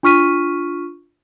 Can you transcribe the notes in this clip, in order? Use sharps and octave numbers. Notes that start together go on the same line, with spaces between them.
D4 F4 C#6 F6 B6 D#7